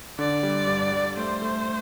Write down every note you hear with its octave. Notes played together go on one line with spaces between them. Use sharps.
D3 D5
G3
G2
G3
A3 C5
A3